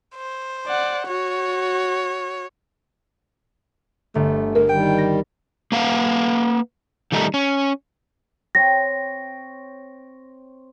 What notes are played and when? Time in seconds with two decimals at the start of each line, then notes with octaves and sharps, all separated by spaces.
0.16 C5
0.67 D5 F#5
1.08 F#4 C#5
4.15 G1 A3
4.55 A#4
4.69 D#3 G3 G5
4.98 A#6
5.72 A#3 B4 F5 F#5
7.12 D#3 G3 A3 D#4
7.34 C#4
8.55 C4 C#5 G5 A#6